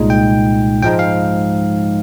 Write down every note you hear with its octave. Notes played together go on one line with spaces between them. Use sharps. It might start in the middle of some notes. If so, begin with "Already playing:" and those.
Already playing: C2 A#2 G#3 D#4
G5
G#2 F3 G#3 D#4 G5
F5